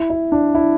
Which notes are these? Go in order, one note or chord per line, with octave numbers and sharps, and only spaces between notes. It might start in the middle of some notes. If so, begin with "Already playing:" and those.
Already playing: E4
E4
D4
E4